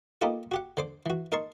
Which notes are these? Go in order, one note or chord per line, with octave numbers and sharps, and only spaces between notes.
A#3 B3 D#4 F4 G4 A4
F#4 G4 F#5
D3 C5 D6
E3 F#4
D#4 A#4 A5 C6 C#6